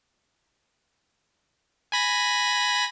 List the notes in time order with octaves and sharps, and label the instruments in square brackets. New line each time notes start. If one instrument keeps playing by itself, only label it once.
[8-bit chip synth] G#5 B5 A#6